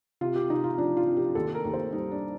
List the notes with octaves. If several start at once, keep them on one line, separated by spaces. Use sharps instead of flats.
C3 F4
G4
C3 D#4
F4
F3 D4
F4
C3
G4
D#2 A4
A#4
D#2
C5
G3 D#4
D4